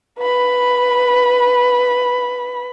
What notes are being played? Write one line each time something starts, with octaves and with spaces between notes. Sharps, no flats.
B4 B5